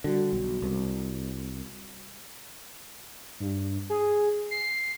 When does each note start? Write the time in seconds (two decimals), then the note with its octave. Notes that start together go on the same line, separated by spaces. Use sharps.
0.04 D3 G3 F#4
0.33 B1
0.62 C2
3.40 G2
3.90 G#4
4.51 C7